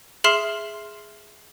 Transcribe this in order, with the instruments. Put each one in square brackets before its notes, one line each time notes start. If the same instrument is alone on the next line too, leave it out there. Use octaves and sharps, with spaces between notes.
[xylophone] G#4 E5 C6 F6 C7 E7